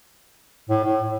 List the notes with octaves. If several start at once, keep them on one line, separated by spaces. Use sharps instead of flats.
A2
A2